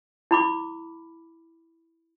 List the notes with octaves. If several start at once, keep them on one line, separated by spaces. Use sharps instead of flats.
E4 B5 D6